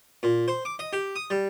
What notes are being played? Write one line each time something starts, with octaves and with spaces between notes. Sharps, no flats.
A#2
C5
D6
D#5
G4
D#6
G3